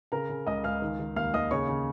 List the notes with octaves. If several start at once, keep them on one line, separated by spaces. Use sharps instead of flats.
C#3 A#4 A#5
C#3
C#2 D#5 D#6
C#2 F5 F6
D#3
D#3
D#2 F5 F6
D#2 D#5 D#6
C#3 C#5 C#6
C#3